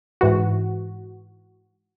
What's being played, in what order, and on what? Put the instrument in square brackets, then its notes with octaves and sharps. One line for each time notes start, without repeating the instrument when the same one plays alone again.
[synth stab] G#2 E3 F#4